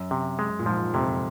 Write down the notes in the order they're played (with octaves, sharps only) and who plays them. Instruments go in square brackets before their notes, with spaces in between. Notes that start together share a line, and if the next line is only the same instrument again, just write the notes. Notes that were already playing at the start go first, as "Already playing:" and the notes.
Already playing: [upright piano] F#2
[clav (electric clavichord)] C3
G#3
[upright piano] A#2
[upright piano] G#2 [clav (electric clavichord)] F3
[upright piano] F2 [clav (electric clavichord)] C3